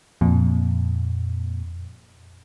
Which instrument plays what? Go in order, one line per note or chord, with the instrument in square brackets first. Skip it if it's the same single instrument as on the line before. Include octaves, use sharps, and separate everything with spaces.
[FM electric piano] F2 A#2